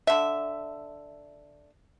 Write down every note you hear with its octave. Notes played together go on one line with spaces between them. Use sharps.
D3 E5